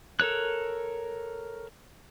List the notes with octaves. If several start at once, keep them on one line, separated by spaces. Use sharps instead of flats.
A4 A#4 C#5 F#6